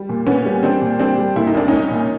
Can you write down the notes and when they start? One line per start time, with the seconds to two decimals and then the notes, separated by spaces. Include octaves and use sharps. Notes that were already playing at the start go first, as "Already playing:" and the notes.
Already playing: G3
0.09 A#2
0.27 A#2 B3 C#4
0.46 G3
0.63 G3 C4 D4
0.81 A#2
1.00 G3 C4 D4
1.18 G3
1.36 A#2 E4
1.47 D#4
1.55 C2 D4
1.68 C2 C#4 D#4
1.91 A#2